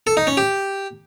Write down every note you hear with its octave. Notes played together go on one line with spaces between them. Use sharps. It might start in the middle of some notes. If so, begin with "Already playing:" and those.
A4
D#4
C#4
G4